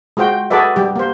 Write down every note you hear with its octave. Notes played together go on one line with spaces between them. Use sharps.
G#3 F4 F#4 C5 G5
F#4 G#4 A4 B4 D5 E5
G3 G4
A#3 C5